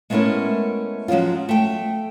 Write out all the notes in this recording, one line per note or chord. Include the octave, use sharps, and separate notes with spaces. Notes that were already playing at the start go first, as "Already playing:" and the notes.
G#3 A3 B3 C#4 E4 A#4
F3 F#3 G#3 C#4 F4
A3 G5